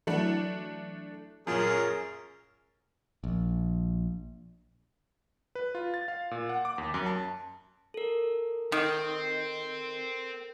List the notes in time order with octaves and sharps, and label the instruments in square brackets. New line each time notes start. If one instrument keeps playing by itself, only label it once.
[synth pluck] E3 F#3 E4 [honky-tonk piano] A3 D4
[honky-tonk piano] F#2 A#2 [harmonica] C#4 G#4 A#4
[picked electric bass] A#1
[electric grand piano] B4
F4
A6
F5
A#2
F#5
D6
D#2
F#2
A5
[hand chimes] A4 A#4
[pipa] D#3 [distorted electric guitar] C4